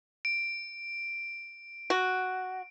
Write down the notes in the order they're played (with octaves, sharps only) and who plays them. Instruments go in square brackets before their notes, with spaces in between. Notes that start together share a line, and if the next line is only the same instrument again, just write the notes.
[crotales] D7
[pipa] F#4